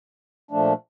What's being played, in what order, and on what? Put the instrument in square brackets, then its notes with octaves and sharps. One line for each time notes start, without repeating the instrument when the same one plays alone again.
[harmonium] A#2 F3 A3 D4